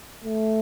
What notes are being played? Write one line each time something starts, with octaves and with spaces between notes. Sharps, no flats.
A3